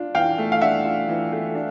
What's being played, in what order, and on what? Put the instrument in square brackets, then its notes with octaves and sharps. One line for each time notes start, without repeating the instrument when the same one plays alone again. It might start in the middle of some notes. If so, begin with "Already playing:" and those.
Already playing: [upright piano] D4 F4
[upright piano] E3 [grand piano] F5 G5
[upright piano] A3
[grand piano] F5
[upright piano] D4 [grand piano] E5 F#5
[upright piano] F4
E3
A3
D4